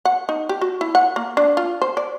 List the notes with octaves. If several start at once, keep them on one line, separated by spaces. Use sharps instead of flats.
F#5
D#4
G4
F#4
E4
F#5
A#3
D4
F4
C5
D5